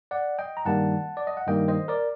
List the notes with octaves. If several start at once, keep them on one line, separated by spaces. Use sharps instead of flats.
D5 F#5
D#5 G5
A#5
G2 D#3 G3 A#3 F#5 A5
D5
D#5
F#5
G2 D#3 G3 A#3 D#5 G5
C5 D#5
A#4 D5